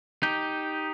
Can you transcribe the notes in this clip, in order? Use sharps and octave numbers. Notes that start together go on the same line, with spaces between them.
D#4 G4